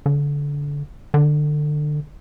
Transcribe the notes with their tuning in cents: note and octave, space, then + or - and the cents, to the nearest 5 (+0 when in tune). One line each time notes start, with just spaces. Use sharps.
D3 -25
D3 +25